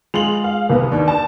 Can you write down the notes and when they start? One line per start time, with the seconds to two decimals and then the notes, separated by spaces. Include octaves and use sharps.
0.14 G#3 F4 F7 F#7
0.44 F5
0.69 C2 A#3 B3
0.92 D#2 D4
1.08 A5